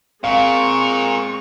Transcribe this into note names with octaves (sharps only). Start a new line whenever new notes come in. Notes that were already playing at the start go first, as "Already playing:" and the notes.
A#2 G#3 C4 F5 C#6